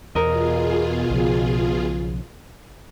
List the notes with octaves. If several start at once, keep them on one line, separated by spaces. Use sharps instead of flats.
E2 B2 F4 G#4 A#4 D#5
B1 C#3 F3